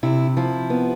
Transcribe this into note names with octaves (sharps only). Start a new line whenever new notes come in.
C3 E4
F3 E4
B3